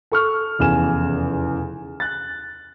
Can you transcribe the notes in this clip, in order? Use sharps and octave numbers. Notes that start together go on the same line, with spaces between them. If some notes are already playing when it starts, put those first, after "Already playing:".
A4 C#6 F6
F1 E2 C#3 G#5 E7
F#6 A6